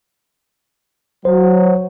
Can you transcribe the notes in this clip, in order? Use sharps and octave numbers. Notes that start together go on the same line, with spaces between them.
F#3 C5